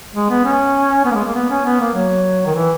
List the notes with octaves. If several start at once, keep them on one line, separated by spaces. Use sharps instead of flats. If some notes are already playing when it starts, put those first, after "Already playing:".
G#3
B3
C#4
B3
A#3
G#3
A#3
B3
C#4
B3
A#3
F#3
D#3
E3